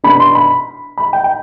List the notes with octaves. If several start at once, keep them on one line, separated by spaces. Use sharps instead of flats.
B2 B3 D4 B5
C6
B5
B5
G5
G5